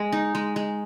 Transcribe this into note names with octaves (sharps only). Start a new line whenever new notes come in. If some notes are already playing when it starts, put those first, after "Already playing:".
Already playing: G#3
D#4
G#3
G#3